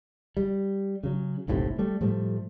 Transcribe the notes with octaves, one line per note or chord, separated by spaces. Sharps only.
G3
C#3 F#3
F#1 B1 A2 C3
G3 A3
A2 F3 G3 A3